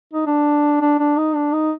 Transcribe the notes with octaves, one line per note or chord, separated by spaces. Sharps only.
D#4
D4
D4
D4
D#4
D4
D#4